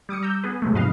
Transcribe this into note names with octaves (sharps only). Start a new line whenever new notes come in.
G3 D6 D#6 C#7
A#5 E6 G6
B3 G#4 B4
B2 F#3 G#3 A3
F2 G#2 C3 B4 D#5 F5